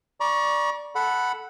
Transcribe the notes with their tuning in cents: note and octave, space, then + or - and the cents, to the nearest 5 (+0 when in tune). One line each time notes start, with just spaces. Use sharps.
D5 +0 A#5 +45 C#6 +0
A4 -5 F#5 +0 B5 +0